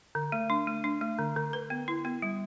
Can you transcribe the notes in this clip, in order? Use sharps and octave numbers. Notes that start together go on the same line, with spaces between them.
D3
A3
D4
A3
D4
A3
D3
D3
B4
B3
E4
B3
G3